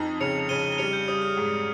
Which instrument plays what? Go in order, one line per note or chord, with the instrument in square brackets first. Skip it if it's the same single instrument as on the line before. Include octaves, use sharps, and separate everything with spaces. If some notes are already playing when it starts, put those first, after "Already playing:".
Already playing: [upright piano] F2 D#4
[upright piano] C#3 [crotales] C#7 F7
[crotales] F7
[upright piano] C#3 [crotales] D#7 G7
[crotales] G7
[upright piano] G3 [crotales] C#7 F7
[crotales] G6
[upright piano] G3 [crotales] D#6
[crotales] F6
[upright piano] G#2